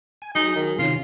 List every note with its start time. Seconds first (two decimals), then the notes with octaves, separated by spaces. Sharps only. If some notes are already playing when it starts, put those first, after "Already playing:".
0.22 G#5
0.35 F#3 D#4 G#4
0.56 D#3
0.79 C3 D#3 C#4 F4